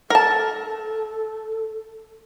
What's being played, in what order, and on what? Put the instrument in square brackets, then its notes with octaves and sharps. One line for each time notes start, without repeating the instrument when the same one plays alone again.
[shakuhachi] A4 [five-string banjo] A#4 A5